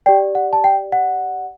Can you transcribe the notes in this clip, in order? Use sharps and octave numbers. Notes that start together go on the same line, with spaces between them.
G4 D5 G5
F#5
A5
G5
F#5